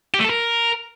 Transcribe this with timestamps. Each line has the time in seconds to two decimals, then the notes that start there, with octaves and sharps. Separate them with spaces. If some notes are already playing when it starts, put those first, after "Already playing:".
0.14 G4
0.19 A3
0.24 A4
0.30 A#4